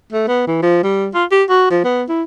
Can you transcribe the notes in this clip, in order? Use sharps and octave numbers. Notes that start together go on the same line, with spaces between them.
A3
B3
E3
F3
G3
F4
G4
F#4
F3
B3
E4